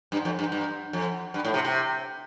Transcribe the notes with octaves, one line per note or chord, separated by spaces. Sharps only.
G2
F2
G2
G2
F2
G2
A2
C3
C3